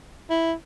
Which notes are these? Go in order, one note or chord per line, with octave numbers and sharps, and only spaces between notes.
E4